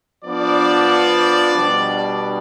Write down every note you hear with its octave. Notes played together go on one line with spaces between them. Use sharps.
F3 B3 D4 D5
B2 G3 D4